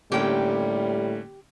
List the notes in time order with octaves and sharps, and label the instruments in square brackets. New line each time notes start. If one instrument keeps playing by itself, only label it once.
[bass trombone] A2 [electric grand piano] D3 A#3 C#4 [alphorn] G3 [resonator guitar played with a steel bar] G4 G5